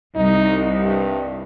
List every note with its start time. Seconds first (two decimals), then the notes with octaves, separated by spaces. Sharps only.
0.16 C2 D#4
0.83 G2